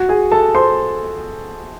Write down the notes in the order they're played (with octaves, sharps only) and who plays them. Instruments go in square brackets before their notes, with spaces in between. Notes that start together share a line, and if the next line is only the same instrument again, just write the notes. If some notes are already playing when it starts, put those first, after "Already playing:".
Already playing: [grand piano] F#4 F#5
G#4 G#5
A4 A5
C5 C6